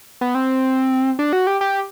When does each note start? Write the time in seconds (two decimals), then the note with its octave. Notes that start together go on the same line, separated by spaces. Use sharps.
0.21 B3
0.35 C4
1.19 D4
1.33 F#4
1.47 G4
1.61 G4